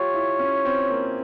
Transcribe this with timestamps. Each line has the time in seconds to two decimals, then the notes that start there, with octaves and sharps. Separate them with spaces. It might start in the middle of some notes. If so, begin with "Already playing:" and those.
Already playing: F4 G4 C#5
0.14 E4
0.39 C#4
0.65 C4
0.91 A#3